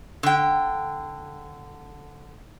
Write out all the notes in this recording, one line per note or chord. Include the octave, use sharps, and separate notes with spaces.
D3 G5